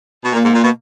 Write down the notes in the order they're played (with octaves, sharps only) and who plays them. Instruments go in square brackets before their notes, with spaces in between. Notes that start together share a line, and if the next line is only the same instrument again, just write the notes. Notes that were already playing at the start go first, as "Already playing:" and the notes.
[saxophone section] B2
[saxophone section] A#2 [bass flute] A#3
[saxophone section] G#2
A#2
B2